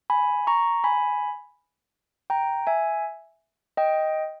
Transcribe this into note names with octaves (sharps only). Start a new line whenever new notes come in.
G#5 B5
A#5 C#6
G#5 B5
G5 A#5
E5 G#5
D#5 G5